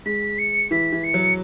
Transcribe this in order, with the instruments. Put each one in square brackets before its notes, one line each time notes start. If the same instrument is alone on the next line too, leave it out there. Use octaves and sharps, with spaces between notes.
[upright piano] G#3 [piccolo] B6
[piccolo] C#7
[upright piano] E3 [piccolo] B6
[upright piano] E3
[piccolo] C#7
[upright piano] F#3